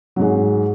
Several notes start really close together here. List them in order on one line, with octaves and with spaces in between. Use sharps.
F#3 G#2 G#3